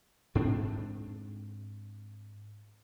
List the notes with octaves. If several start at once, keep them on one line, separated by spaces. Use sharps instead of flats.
G#2 C4 D4